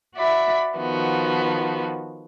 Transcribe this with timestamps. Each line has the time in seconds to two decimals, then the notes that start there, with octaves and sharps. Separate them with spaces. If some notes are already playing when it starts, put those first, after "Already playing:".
0.15 F#4 D5 E5 B5
0.75 D#3 F3 B3 F#4